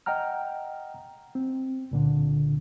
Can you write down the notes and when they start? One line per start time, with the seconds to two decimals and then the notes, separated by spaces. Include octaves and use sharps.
0.06 D#5 F#5 G5 A#5 F6
1.35 C4
1.91 C#2 A#2 D3